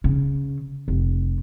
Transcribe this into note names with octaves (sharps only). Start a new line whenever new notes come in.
C#3
F1